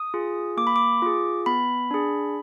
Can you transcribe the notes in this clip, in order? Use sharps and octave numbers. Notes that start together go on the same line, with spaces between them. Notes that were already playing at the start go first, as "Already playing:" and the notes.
Already playing: D#6
F4 G#4
A#3 D6
B5
D6
F4 G#4
B3 B5
D4 G#4